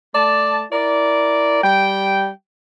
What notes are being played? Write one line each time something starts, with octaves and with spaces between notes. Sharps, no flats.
A3 D5 A5
E4 A#4 D5
G3 G5